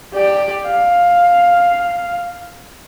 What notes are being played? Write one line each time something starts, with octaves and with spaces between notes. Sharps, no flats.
G4 D5
F5